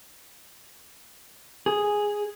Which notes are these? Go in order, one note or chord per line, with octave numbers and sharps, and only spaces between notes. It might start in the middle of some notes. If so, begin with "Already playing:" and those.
G#4